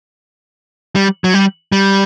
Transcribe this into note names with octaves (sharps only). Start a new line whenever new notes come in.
G3
F#3
G3
G3